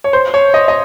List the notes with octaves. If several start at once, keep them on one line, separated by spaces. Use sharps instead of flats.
C#5
C5
C#5
D#5
D#5